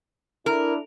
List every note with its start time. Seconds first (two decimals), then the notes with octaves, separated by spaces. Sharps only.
0.46 D4 E4 A#4